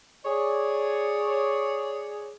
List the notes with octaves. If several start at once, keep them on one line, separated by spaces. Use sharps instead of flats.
G#4 C#5 D5